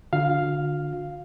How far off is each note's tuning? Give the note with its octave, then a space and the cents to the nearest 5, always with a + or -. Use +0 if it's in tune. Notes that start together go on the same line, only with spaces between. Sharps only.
D3 +0 F4 +45 F5 +0